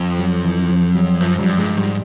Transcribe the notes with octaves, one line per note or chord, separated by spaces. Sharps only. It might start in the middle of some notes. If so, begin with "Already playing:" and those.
Already playing: F2
F#3
E3
F3
F#3
F#2 F3
F#2 G3
G2 G#3
G#2 G3